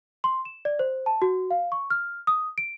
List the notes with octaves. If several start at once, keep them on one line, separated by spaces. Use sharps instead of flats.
C6
E7
D5
C5
A5
F#4
F5
C#6
F6
D#6
D7